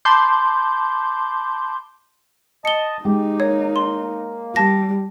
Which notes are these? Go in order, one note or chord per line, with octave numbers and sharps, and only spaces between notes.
A5 B5 C6 D6 G6
D#5 A5 C#7 G7
G#3 D#4 G4
A#3 C#5
C6
G3 A5 A#6